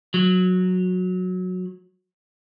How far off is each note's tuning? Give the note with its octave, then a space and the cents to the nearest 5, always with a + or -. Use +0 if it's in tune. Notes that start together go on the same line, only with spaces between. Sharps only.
F#3 -15